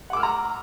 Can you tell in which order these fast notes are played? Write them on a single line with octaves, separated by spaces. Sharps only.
F#5 D6 E6 F6 A#5